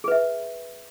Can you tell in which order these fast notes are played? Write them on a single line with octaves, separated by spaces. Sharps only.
G#4 B4 E5